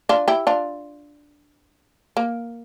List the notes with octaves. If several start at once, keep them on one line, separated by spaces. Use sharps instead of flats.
D4 F4
E4 G4
D4 F4
A#3